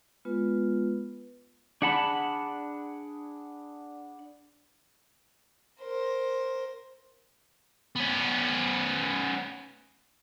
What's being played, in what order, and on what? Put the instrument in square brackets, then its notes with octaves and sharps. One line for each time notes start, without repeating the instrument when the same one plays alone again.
[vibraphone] G#3 B3 F4 B4
[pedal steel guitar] D4 G#4 F#5 A5 B5
[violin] A#4 C5
[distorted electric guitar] B3 C#4